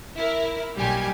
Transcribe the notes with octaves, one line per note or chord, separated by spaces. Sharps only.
E4 A#4
B1 D#3 G3 A#3 G4 G#5